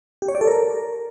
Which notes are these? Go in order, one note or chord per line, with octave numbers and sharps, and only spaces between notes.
G4
C#5
D5
A4
A#4